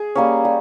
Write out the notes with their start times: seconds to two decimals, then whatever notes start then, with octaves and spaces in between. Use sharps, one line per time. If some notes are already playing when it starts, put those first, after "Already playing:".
Already playing: G#4
0.15 G3 A#3 C#4
0.45 G3